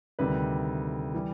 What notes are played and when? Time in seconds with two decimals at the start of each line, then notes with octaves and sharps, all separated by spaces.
0.19 D2 C3 D#3 G3 B4
1.14 E3 G3